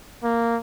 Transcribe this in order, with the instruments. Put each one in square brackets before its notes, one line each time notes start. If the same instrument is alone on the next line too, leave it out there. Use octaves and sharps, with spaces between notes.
[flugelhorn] A#3